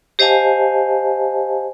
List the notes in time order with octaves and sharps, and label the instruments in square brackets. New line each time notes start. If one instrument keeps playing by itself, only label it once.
[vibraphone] G4 C5 D#5 F5 G#5 A5